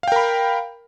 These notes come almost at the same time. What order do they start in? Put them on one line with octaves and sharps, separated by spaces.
F5 G5 A#4 B5